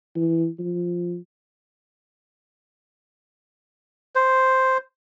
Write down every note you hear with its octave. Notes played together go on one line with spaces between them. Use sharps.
E3
F3
C5